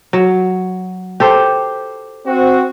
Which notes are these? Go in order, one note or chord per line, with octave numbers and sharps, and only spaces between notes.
F#3
G4 A4 C5
C4 F#4